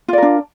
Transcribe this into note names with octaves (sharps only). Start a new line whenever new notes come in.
D4 F4 A#4 D5